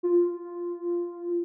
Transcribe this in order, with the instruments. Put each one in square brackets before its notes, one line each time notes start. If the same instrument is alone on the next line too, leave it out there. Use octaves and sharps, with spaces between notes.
[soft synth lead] F4